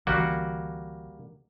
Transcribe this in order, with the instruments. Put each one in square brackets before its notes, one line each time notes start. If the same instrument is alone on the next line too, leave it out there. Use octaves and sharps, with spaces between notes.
[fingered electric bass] C#2 D3 E3 [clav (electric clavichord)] G3 A#3 F#4